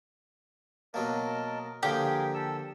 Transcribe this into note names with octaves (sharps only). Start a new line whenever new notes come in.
B2 F#3 A#3 A#4 D#5 A5
D3 F3 A#3 G4 G#4 A#4
A4 E6